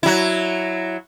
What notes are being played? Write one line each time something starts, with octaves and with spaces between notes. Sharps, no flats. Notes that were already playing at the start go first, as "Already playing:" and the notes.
F#3 E4